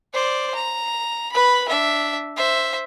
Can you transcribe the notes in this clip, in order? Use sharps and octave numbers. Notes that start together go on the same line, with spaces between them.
C5 D5
A#5
B4 B5
D4 E5
C5 E5